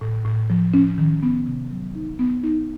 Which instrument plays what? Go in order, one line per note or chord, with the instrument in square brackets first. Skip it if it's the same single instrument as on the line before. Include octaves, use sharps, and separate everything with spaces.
[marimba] A2
A2
F3
C#4
D#3
B3
C3
F#3
D#4
B3
D#4